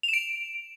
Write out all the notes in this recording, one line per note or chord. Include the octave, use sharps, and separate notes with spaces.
F7
E7
D7